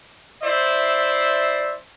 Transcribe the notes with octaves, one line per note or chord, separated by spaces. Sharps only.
E4 C5 D5 E5